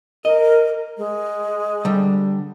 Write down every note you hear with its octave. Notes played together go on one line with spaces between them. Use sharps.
A#4 D#5
G#3
D3 G3